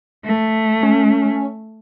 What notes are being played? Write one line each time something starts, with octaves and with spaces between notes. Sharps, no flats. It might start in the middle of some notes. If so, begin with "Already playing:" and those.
A3
C#4